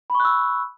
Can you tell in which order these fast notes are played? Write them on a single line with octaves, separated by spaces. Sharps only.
B5 C#6 F#6 E6